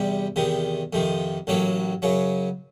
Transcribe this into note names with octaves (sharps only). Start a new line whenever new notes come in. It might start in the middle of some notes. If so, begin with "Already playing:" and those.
Already playing: E2 C3 G3
E2 C3 D#3
F2 C3 D#3
A1 A2 F#3 A#3
F#2 C#3 F#3